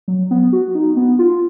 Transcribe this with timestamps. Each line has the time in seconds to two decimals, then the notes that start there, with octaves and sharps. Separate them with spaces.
0.08 F#3
0.31 B3
0.53 F#4
0.75 D#4
0.97 B3
1.19 F4